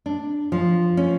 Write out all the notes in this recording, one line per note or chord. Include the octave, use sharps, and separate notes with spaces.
D4
F3
C#4